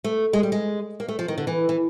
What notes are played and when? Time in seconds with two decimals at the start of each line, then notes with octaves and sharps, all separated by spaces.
0.04 A3
0.33 G#3
0.43 G3
0.52 G#3
1.00 A#3
1.08 A3
1.19 F3
1.28 D#3
1.38 D3
1.47 E3
1.69 E3